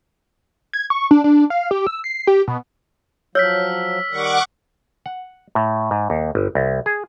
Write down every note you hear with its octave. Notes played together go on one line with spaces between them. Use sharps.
G#6
C#6
D4
D4
F5
G4
E6
C7
G4
B2
F3 F#3 C#5 E6 F6 B6
D#3 G3 F#5 C#6 D6
F#5
A2
G#2
D#2
G1
C2
G#4